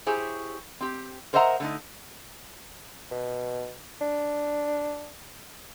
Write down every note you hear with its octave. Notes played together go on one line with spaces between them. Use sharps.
E4 G4 G#4 C5 C#5
C4 G4
A#4 C5 D#5 E5 F#5 A#5
D3 A3 D#4
B2
D4